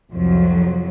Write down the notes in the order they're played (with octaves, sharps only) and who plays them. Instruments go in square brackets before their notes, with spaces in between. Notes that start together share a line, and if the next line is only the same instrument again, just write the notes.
[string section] C2 F2 F3 F#3